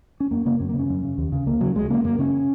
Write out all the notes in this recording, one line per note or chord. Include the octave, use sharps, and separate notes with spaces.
C#4
F#2 A#3
C#3 A#3
F#2 C#4
A#3
C#3
C#4
F#2
C#3
D#2
C#3
C#2 A#3
C#3 F#3
C#2 G#3
C#3 A#3
F#2 A#3
C#3 C#4